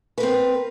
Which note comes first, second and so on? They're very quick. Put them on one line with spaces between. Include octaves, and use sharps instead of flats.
B4 A#4 C4